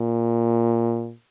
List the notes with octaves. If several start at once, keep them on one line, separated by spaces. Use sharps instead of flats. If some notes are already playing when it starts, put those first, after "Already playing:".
Already playing: A#2